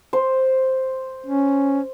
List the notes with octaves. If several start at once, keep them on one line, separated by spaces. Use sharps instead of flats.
C5
C#4